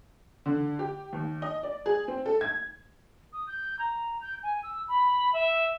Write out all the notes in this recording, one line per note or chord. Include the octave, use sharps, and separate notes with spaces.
D3
G4
D#2
D#5
D5
G#4
C4
A4
G#6
D#6
G6
A#5
G6
G#5
E6
B5
E5